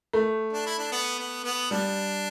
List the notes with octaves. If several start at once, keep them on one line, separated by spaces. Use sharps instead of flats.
A3
D4
E4
D4
B3
B3
B3
G3 D4